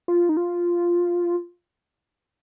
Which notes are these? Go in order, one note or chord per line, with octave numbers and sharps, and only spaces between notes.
F4
D#4
F4